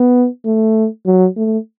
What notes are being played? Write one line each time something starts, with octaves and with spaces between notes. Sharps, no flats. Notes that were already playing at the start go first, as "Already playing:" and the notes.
Already playing: B3
A3
F#3
A3